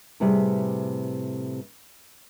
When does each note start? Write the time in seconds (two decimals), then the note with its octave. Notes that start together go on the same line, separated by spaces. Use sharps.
0.20 A2 C3 G3 G#4 B4